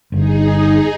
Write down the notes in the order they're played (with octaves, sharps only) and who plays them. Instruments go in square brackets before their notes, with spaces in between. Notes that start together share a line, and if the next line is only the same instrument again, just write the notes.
[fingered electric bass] G1 [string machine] D#4 G#4